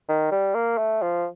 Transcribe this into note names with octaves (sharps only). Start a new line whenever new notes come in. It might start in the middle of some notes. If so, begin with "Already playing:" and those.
D#3
G3
A#3
A3
F3